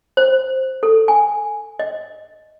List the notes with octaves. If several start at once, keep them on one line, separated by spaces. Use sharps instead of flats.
C5
A4
G#5
D#5